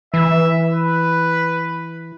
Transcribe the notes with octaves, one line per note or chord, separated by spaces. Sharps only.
E3 E5
B4